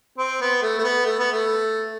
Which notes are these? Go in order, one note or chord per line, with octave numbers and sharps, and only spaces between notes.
C4
B3
A3
A3
B3
A3
B3
A3